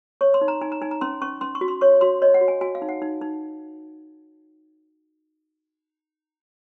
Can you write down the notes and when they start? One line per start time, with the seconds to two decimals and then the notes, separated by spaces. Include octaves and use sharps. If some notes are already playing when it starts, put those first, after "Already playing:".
0.21 C#5 C#6
0.34 C6
0.41 D#4
0.48 A#5
0.61 D#4 G#5
0.72 A#5
0.82 D#4 G#5
0.91 A#5
1.01 C#4 C6
1.22 C#4 C#6
1.41 C#4 C6
1.55 C#6
1.61 F#4
1.68 C6
1.81 C#5 C#6
2.01 F#4 C6
2.22 C#5 D#5
2.34 F#5
2.41 F#4
2.48 G#5
2.61 F#4 G#5
2.75 F5
2.82 D#4
2.89 F#5
3.02 D#4
3.22 D#4